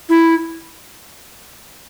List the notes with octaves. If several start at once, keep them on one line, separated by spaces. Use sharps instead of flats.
E4